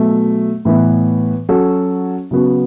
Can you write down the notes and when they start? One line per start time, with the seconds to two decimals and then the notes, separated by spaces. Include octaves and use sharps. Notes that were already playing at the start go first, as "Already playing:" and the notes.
Already playing: B2 F#3 A3
0.65 A2 E3 B3
1.49 F#3 C#4 F#4 A4
2.31 C#3 F#3 B3 F#4